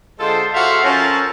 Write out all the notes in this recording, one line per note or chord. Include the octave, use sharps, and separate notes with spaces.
D3 G#3 F4 A4 C5
F#4 A4 C5 E5 F5
F3 C#4 A4 A#4 C5 A5